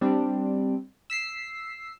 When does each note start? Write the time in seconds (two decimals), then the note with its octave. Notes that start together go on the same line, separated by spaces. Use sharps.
0.01 G3 C4 D4
1.10 E6 B6 C7